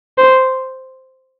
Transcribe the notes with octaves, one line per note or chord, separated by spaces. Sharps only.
C5